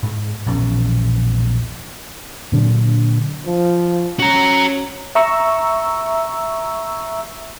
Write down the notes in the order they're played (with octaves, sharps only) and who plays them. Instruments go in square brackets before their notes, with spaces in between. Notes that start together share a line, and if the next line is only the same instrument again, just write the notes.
[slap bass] G#2
A#1 E2 B2 C#4
[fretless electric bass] A#2 D3 F#3 D4
[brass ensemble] F3
[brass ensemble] C#4 [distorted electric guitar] F#4 A#5
[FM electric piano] E5 A#5 C#6 E6